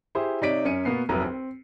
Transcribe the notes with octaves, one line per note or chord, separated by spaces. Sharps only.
E4 G4 G#4 C5
C3 D#4 C#5 D5 B6 D7
F#2 C#4 C#7 D#7
B2 A#3 B3 C7
F1 C2 F#3 B4 A#5
C4